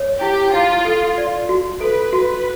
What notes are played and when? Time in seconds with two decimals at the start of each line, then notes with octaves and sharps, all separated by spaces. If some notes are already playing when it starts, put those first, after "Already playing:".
Already playing: C#5
0.21 E4 G4
0.53 E4 F4
0.85 A4
1.18 D5
1.49 F#4
1.81 A4 B4
2.13 F#4 B4